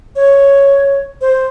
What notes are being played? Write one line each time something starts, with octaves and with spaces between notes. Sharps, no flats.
C#5
C5